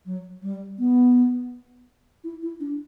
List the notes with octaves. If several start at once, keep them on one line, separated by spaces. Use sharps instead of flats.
F#3
G3
B3
E4
E4
D4